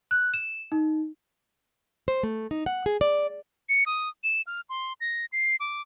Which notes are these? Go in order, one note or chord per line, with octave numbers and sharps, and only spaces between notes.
F#6
E7
D#4
C5
A3
D#4
F#5
G#4
D5
C#7
D#6
E7
F6
C6
A#6
C7
D6